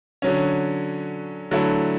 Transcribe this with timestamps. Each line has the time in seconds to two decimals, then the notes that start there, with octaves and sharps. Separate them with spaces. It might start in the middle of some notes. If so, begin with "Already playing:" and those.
0.22 D3 F#3 C#4
1.51 D3 F#3 A3 E4